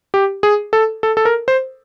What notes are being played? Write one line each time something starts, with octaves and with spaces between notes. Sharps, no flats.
G4
G#4
A4
A4
A4
A#4
C5